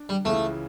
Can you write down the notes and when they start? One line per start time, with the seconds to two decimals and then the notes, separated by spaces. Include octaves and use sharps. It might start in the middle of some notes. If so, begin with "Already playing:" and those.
Already playing: D4
0.09 G3
0.25 C#2 C#3 E3 A3